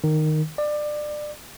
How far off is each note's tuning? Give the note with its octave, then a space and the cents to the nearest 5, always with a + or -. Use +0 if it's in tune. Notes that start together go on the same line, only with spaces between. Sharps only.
D#3 -10
D5 +25